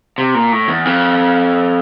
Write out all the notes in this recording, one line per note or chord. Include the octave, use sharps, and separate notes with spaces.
C3
A#2
A2
E2
F2